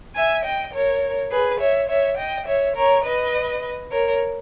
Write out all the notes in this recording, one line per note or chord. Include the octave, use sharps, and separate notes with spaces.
E5 G#5
D#5 G5
A#4 C#5
G#4 B4
C#5 E5
C#5 E5
D#5 G5
C#5 E5
A#4 C#5
B4 D#5
A#4 C#5